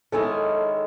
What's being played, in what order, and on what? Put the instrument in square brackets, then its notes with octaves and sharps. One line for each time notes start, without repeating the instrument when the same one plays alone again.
[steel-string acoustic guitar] D#3 G#3 C#4 E4 [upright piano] A4
[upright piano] A4